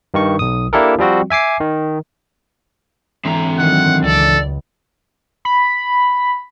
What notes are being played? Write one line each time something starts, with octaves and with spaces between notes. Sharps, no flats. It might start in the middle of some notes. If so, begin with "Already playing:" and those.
G2 D#3 C#6
B1 D#6
A#3 D4 E4 G4 A4 A#4
F3 G3 C4 F#4
E5 G#5 D6 C7
D#3
G#2 D3 E3 C4 A#5
D#3 F#3 F#5
C#2 A4 D5
B5